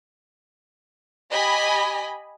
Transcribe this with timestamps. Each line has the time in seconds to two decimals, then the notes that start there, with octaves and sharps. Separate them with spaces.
1.32 G4 D#5 G#5 B5